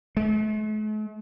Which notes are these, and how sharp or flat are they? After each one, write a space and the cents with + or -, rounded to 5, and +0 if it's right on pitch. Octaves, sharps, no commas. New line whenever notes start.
A3 -45